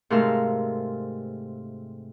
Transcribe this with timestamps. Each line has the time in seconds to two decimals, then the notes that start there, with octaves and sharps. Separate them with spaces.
0.10 G#2 C3 A3 A#4 F5 E6